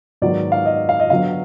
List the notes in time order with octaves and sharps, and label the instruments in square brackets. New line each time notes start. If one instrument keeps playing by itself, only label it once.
[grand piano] G#2 D#3 F#3 B3 D5
F5
D#5
F5
D#5
D3 F#3 B3 F5